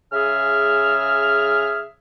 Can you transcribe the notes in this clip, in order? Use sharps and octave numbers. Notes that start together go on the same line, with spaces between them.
C#3 G#4 E5 F6